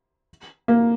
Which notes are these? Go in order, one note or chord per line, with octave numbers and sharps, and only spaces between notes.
A#3